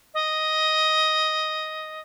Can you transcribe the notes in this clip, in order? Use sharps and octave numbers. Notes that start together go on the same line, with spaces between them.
D#5